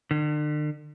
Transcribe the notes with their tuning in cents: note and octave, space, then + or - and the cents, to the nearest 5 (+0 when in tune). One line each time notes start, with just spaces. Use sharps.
D3 +40